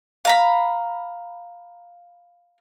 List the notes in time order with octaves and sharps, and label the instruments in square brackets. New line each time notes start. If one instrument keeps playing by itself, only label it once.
[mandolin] F5 A#5 B5